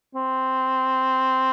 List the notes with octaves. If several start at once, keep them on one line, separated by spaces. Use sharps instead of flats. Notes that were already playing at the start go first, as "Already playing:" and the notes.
C4